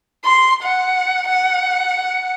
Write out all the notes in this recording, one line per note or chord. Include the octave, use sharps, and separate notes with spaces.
C6
F#5
F#5